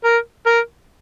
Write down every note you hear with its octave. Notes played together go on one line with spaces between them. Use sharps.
A#4
A#4